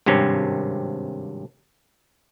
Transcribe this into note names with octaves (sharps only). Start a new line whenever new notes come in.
G#1 G2 C3 C#4